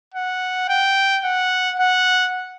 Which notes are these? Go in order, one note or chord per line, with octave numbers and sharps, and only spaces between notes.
F#5
G5
F#5
F#5